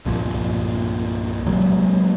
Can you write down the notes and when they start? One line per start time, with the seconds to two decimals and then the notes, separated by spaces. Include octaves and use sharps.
0.05 C2 G2 A#2 F3
1.46 C3 F#3 G#3 A#3